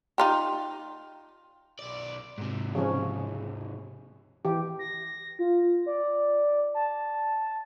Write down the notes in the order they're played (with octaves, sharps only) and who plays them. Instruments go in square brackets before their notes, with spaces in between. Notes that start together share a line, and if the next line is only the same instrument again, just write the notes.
[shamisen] D#4 F4 G4
[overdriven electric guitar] B1 D5
G#2 C3
[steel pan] C#3 F3 C#4
E3 G4
[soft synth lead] A#6
F4
D5
A5